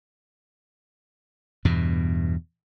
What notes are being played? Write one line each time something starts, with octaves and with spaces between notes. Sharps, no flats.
E2 G2 B2